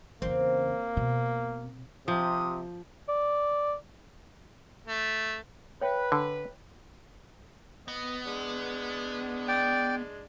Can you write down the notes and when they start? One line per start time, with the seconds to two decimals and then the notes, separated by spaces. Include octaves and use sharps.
0.22 E2 C#3 A#3 C4
0.97 B2
2.08 C3 F3 D#6
3.09 D5
4.88 A3
5.81 B4 C#5 E5 G5
6.12 D3
7.88 B3 D#5
8.26 G#3 D4
9.48 D5 G5